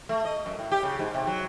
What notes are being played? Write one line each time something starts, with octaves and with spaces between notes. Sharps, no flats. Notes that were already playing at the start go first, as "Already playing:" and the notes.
A3
D#5
F#2
A2
G4
C#3
G#2
C3
F#3